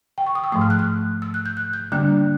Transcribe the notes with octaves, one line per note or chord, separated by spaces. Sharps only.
G5
C#6
D#6
E6
G#2 F3 A3 D#6
F6
F#6
F6
E6
F#6
G6
F#6
G6
D3 G3 A#3 D4 F#6